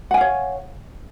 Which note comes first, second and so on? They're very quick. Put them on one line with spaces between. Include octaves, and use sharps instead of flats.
F#5 G#5 F5 C#5